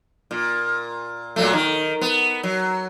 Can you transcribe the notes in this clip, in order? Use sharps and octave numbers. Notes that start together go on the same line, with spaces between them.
A#2
A#2 F#3 A3
D#3
B3
F#3